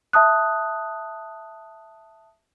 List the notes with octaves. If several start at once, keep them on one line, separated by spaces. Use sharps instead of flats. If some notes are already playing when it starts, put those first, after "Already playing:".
E5 A5 D#6 F#6